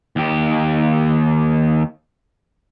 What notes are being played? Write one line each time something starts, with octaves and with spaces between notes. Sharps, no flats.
D#2 G4